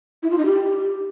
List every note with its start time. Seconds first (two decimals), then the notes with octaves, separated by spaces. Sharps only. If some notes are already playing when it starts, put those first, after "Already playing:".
0.23 E4
0.30 F4
0.38 D#4
0.46 G4